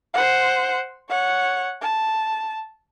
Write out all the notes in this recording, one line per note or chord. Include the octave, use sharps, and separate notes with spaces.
C5 F#5
C#5 F#5
A5